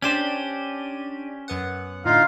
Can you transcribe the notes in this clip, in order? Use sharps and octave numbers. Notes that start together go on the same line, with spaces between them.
C#4 D4 G4 C5 D5 D#7
F#2 B3 F#5
A2 D3 D#4 F4 F5